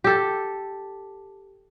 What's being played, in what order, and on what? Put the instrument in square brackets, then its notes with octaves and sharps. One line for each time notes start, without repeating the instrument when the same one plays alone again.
[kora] G4 A4